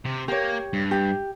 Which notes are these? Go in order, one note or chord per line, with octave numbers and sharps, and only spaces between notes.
C3 G4
A#3 G4 C#5
G2
G4